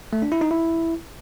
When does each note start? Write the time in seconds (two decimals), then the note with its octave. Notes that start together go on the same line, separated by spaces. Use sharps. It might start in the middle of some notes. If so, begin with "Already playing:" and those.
0.13 A3
0.22 D4
0.32 E4
0.41 D#4
0.51 E4